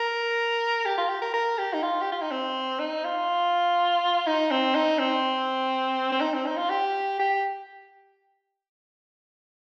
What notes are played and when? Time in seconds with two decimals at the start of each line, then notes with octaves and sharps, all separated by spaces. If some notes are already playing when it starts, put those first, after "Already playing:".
Already playing: A#4
0.85 G4
0.97 F4
1.09 G4
1.22 A#4
1.34 A#4
1.58 G4
1.73 D#4
1.83 F4
2.01 G4
2.12 F4
2.22 D#4
2.32 C4
2.80 D#4
3.04 F4
4.27 D#4
4.51 C4
4.75 D#4
4.99 C4
6.12 C4
6.21 D#4
6.34 C4
6.46 D#4
6.57 F4
6.70 G4
7.19 G4